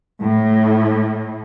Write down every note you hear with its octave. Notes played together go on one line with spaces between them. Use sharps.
A2